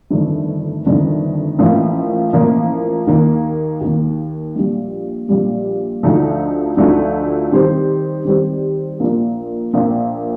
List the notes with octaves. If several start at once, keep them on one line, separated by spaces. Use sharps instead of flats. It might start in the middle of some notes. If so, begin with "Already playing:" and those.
G1 F2 D#3 A3 D4
G1 F2 D#3 A3 D4
A1 A2 F3 A#3 F4
A1 A2 F3 A#3 F4
D#2 D#3 A#3
D#2 D#3 A#3
A#1 A#2 G3
A#1 A#2 G3
D2 D3 F3 A3 D#4
D2 D3 F3 A3 D#4
D#3 G3 C4 G4 C5
D#3 G3 C4 G4 C5
A#1 A#2 F3 A#3
A#1 A#2 F3 A#3